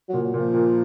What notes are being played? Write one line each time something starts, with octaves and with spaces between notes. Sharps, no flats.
A#2 F#3
F#3
A#2
F3
A#2